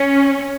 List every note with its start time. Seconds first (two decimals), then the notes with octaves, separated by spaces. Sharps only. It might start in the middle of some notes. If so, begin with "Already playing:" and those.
Already playing: C#4